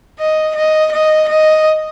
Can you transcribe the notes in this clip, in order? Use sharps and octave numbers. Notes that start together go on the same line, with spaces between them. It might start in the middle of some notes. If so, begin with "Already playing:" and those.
D#5
D#5
D#5
D#5